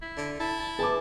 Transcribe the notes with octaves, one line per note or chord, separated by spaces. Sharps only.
E4
D3
E4 A5
A5
G#4 B4 A5 D6